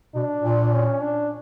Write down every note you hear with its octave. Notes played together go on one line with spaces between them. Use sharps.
B2 D4
A#2
C#4
D4